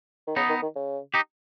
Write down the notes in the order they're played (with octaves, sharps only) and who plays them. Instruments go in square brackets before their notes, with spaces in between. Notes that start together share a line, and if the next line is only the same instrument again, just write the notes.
[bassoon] D#3
[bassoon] C#3 [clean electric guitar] B3 D#4
[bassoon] D#3
D#3
C#3
[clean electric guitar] D#4 G4